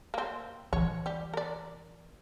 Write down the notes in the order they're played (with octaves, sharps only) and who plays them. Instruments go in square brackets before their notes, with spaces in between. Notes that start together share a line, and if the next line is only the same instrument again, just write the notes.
[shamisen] A#3 C4
[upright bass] E3 F4 [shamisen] C#5
[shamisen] G3 G4
A#4 D5